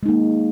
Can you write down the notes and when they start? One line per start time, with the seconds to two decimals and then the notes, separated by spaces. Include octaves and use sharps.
0.03 G#3
0.06 D#4
0.09 A#3